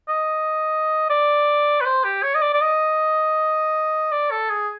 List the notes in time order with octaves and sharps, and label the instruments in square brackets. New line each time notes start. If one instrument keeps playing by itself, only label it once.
[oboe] D#5
D5
B4
C5
G4
C#5
D#5
D5
D5
D#5
D5
A4
G#4